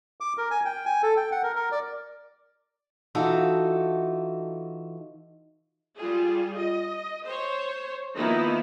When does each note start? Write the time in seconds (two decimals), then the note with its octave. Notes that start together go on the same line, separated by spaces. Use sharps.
0.20 D6
0.38 A#4
0.51 G#5
0.65 G5
0.86 G#5
1.03 A4
1.17 G5
1.32 F#5
1.43 A#4
1.56 A#4
1.72 D5
3.15 E3 D#4 F4 F#4 A4
5.98 G3 F4 G#4
6.57 D#5
7.26 C5 C#5
8.16 D#3 F3 A#3 B3 D#4 E4